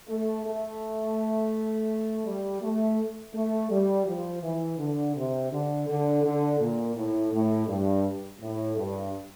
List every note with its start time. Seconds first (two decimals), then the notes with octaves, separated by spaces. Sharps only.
0.08 A3
0.45 A3
2.26 G3
2.62 A3
3.34 A3
3.70 G3
4.07 F3
4.43 E3
4.79 D3
5.16 C3
5.51 D3
5.88 D3
6.24 D3
6.60 A#2
6.96 A2
7.32 A2
7.68 G2
8.41 A2
8.77 G2